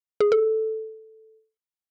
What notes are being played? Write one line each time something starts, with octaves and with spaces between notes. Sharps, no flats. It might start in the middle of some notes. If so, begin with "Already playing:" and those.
G#4
A4